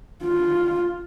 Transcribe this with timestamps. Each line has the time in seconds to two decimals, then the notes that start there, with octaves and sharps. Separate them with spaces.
0.23 F4